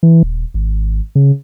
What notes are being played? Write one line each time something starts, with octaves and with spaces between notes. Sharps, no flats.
E3
D#1
G#1
C#3